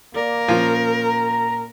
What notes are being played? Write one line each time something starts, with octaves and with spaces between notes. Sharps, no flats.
A#3 A#4 D5
A#2 F3 C#4
A#5